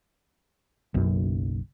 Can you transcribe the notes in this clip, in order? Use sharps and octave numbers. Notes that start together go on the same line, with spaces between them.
F#1 B1 F#2